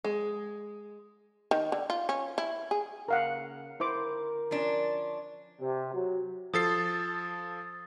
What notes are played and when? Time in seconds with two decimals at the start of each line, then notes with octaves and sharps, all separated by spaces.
0.04 G#3
1.51 D#3
1.72 D3
1.90 F4
2.09 C#4
2.38 E4
2.71 G#4
3.08 C#3 A#3 A#4 F5 F#5
3.80 D3 E4 A#4 C5 D6
4.51 F3 C#4 D4
5.59 C3
5.93 F#3
6.54 F3 A4 D#6 A6 C7